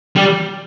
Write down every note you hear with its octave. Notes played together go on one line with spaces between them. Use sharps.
G3